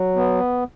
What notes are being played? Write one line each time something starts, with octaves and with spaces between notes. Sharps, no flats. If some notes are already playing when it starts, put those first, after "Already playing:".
Already playing: F#3
B3